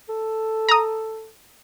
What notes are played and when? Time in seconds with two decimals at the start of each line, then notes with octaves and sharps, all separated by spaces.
0.09 A4
0.69 A#5 D#6